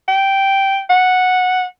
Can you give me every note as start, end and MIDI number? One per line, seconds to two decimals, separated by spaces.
0.08 0.79 79
0.90 1.64 78